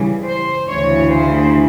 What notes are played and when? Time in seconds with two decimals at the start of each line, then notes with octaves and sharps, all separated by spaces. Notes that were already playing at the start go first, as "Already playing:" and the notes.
Already playing: C#3 E3 G3
0.26 C5
0.69 D2 C#3 E3 C#5
1.12 C5